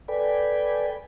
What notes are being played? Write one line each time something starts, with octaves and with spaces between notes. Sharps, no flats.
A4 B4 D5 G5 G#5 B5